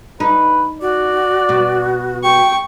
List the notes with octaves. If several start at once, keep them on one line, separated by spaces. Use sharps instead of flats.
D#4 B4
F#4 D5
B2
G5 C#6